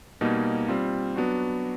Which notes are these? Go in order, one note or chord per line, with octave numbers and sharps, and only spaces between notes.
B2 G3 A#3 D#4
G3 C4 F4
F#3 B3 D4 F#4